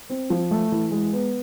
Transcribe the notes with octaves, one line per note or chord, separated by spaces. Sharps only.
C4
F3
A3
E3
G#3
B3